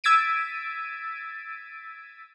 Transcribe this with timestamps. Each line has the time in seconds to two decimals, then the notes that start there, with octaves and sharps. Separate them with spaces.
0.04 E6 G#6 A6 B6 D7 D#7